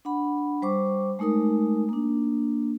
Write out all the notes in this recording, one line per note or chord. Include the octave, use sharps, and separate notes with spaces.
D4 F#5 B5
G3 C5 C#6 D6
G#3 A3 D#4 A#4 D#6
A#3 D4